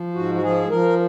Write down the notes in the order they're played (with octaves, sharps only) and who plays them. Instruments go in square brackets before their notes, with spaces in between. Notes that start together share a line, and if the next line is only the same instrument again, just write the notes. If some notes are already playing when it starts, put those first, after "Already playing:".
Already playing: [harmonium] F3
G#2 F#4
F#4
F3 G#4
F3 A#4